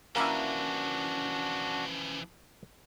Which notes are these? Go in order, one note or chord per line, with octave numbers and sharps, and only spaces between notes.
E3 F3 A#3 C#4 D4 E4 F#4